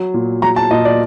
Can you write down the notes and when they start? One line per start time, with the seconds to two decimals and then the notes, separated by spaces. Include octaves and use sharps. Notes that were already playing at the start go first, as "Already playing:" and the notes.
Already playing: F#3
0.14 A#2
0.42 F#3 A#5
0.56 A5
0.71 A#2 D#5
0.85 D5